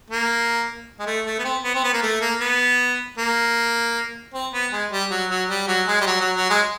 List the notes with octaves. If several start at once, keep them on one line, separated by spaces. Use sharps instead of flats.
A#3
G#3
A3
A3
B3
C4
B3
C4
B3
A#3
A3
A#3
B3
A#3
C4
B3
G#3
G3
F#3
F#3
G3
F#3
G#3
G3
F#3
F#3
F#3
G#3